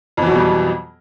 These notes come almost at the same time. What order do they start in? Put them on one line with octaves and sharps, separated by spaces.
F2 E3 F#3 B2 G3